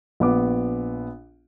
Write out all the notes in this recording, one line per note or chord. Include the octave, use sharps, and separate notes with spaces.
A#1 B3 D6